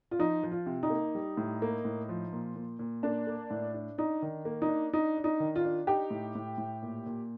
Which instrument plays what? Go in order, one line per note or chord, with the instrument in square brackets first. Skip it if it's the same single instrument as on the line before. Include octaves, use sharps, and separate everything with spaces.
[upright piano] F4
[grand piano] F3 [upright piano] D#4
[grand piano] F3
[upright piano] F4
[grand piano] C3
[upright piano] D#4
[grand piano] A#3
G3
A2
A#3
A2
F3
A#2
A#2
A#2
[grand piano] A#3 [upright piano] D4
[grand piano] A#3
A2
D4
[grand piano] D4 [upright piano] D#4
[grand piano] D#3
A#3
[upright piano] D#4
[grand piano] D4
[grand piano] D4 [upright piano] D#4
[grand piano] D4
[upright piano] D#4
[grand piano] D#3
[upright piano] F4
[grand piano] D4
[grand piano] D#4 [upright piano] G4
[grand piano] A2
A2
A2
A#2
A#2